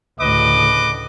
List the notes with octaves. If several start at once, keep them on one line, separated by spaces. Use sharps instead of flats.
D2 A2 C#3 B4 D#5 D6